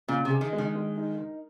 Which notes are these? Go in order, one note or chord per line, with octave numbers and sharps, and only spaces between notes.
A#2 C#3
C3 G#4
D#3
G#3
D#3
G#3
D#4
A#4